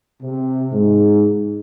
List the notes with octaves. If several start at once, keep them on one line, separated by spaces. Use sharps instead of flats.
C3
G#2